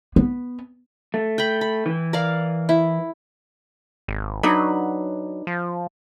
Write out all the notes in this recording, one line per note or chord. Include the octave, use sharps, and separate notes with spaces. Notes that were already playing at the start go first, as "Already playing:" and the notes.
B3
A3
G5 B5
B5
E3
A#4 D5 F5
E4
G#1
F#3 D4 D#4 B4
F3